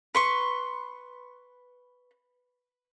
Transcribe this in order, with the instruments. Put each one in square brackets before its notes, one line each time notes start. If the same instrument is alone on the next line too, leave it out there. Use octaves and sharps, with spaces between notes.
[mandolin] B4 C6 C#6